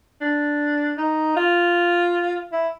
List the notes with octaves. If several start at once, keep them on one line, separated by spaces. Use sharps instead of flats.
D4
D#4
F4
E4